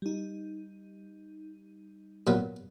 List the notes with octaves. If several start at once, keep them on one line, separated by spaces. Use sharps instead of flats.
G3 D#4
A#2 F#3 B3